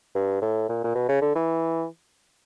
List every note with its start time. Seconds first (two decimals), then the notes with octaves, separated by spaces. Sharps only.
0.15 G2
0.41 A2
0.69 A#2
0.84 A#2
0.95 B2
1.09 C#3
1.21 D3
1.35 E3